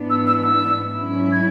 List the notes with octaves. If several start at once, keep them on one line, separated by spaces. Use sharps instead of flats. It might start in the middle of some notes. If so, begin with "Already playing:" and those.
Already playing: G#2 E3 B3 D4
E6
E6
E6
G#2 F#3 C#4 E4
G#6